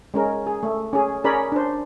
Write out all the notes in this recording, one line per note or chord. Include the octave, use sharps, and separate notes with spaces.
G#3 C#4 A#4
G#4
A3
C#4 G#4
C#4 G#4 A#4 C#5 D5 B5
D4 C5